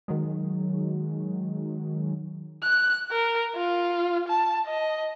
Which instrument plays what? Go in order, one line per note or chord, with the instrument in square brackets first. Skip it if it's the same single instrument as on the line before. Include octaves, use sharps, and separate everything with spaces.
[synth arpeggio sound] D#3 F#3 G#3
[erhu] F#6
A#4
F4
A5
D#5